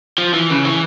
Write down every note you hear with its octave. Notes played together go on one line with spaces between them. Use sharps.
F3
E3
C#3
E3